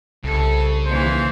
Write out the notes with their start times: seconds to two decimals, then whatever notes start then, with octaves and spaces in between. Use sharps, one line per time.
0.24 C2 C#3 A4
0.85 D#2 E3 C5